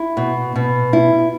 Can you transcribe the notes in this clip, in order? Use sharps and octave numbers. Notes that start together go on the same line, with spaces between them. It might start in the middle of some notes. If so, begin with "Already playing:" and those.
Already playing: E4
B2
B2
E4